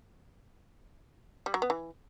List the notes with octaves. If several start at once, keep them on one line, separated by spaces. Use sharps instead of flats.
G3
F#3
B3
E3